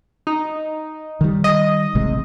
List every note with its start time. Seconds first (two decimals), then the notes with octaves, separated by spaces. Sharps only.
0.27 D#4
1.21 D#3 G3
1.44 D#5
1.95 A1 C3 G#3